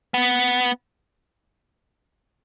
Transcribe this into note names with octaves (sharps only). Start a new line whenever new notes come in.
B3